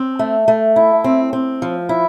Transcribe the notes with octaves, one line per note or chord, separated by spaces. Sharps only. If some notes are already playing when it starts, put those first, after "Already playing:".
Already playing: C4
A3
A3
E4
C4
C4
F3
E4